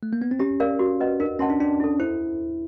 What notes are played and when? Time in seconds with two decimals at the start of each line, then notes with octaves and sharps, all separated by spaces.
0.03 A3
0.13 A#3
0.22 B3
0.31 C4
0.39 C#4 G4
0.60 A#4 D5 F5
0.79 F#4
1.00 B4 D#5 F#5
1.20 D4 A#4
1.39 C#4 D#5 F#5 A5 C6
1.50 D4
1.60 C#4 D4
1.80 E4 A4
2.00 E4 C5